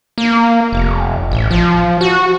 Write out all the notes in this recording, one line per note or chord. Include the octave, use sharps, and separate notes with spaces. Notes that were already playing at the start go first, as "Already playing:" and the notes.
A#3
F1
A1
F3
F#4